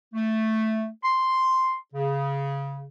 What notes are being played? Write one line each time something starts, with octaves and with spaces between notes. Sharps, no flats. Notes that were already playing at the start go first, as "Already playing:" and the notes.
A3
C6
C#3